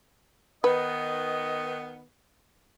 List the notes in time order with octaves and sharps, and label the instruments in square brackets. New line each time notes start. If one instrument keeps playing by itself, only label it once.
[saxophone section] D#3 B3 [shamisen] B4 [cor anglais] D#5